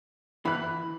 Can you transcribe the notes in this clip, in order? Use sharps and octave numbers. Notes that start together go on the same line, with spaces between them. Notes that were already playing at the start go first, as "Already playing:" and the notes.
E3 B5 F#6